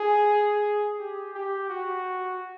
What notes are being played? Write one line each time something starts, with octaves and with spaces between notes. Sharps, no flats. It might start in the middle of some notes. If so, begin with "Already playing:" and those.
Already playing: G#4
G4
G4
F#4